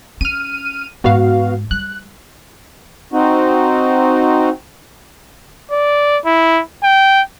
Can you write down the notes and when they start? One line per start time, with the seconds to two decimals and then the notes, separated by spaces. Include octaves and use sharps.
0.21 C#4 F6 D#7
1.04 G#2 G#3 B3 F#4 F5
1.71 G3 F#6
3.13 C4 D#4 F#4
5.71 D5
6.26 E4
6.83 G5